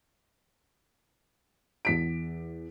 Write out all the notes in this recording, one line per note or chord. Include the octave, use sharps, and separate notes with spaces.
E2 B6 D7